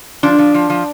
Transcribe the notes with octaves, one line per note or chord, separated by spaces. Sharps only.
F3 D4
F3
F3
F3